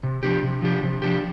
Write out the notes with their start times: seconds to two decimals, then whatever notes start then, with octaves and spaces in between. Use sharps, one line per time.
0.03 C3
0.23 F3 D4 G4
0.43 C3
0.62 F3 D4 G4
0.83 C3
1.02 F3 D4 G4